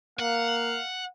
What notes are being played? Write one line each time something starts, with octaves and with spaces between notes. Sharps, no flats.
A#3 F5 F#5